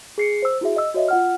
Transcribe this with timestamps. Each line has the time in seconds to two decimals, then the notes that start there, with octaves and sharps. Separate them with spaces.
0.18 G#4 C7 C#7
0.42 C5 E6
0.61 E4 F#4 G#4 E5
0.76 D#5 E6
0.94 F#4 C#5 D#5 E5
1.08 F4 F#5 F6